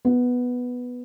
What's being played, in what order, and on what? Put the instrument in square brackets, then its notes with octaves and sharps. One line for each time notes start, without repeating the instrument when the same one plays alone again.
[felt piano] B3